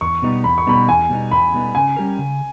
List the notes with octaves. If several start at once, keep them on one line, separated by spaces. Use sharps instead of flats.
E2 C#6
B2 G3 B3 D#4
E2 B5
C#6
B2 G3 B3 D#4 B5
E2 G#5
B2 G3 B3 D#4
E2 B5
B2 G3 B3 D#4
C#3 G#5
G3 C#4 G4 A#4
C#3